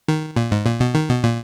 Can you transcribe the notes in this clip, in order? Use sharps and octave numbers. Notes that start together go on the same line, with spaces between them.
D#3
A#2
G#2
A#2
B2
D#3
B2
A#2